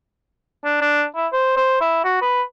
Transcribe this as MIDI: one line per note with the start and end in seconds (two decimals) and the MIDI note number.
0.64 0.78 62
0.81 1.04 62
1.16 1.27 64
1.32 1.55 72
1.56 1.79 72
1.80 2.03 64
2.04 2.17 66
2.21 2.42 71